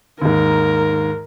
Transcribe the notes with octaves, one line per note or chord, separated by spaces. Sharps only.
D#2 G#2 A#4